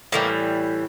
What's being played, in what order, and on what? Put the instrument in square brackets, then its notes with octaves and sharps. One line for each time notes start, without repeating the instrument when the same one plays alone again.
[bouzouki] A2 E3 G3 A#3